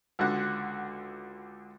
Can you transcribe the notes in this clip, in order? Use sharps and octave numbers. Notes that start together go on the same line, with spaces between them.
C#2 D3 F#4 F#5